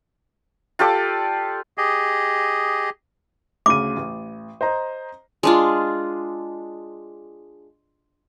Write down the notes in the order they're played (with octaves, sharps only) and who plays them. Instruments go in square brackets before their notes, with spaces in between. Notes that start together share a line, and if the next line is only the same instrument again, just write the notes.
[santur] F4 G4 A4 D5
[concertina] G4 G#4 D#5
[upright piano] D2 C#3 D#7 [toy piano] D6
[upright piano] A1
C5 D#5 A#5
[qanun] G#3 D4 F4